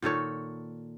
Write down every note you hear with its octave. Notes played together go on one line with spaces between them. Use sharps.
A#2 D#3 A4 C#5